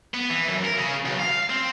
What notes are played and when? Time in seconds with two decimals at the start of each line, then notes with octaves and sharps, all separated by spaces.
0.14 B3
0.30 E3
0.48 F#2
0.65 A#4
0.78 C#3
1.05 B1
1.20 F5
1.50 C4